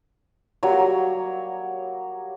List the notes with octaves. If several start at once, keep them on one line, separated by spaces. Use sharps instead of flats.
F#3 G3 A#3 C#5